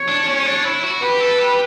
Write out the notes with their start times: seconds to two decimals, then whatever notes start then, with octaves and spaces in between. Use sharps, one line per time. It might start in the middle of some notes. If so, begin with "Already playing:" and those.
Already playing: C#5
0.08 D4
0.26 C#4
0.46 D4
0.64 E4
0.83 F#4
1.02 G4 B4
1.20 A4
1.38 G4